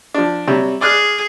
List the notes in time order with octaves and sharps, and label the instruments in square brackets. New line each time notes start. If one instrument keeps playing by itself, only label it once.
[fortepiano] F3 D4
C3 F#3 G3
[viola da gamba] G#4 [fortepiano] D5 F6 F#6